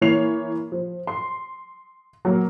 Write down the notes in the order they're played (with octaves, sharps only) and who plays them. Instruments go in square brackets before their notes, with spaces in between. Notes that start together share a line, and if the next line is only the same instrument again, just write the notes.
[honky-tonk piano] E3 A#3 C#5 C7 F7
F3
C6
F#3 A#3